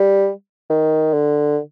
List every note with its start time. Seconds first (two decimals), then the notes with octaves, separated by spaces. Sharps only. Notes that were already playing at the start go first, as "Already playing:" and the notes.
Already playing: G3
0.70 D#3
1.13 D3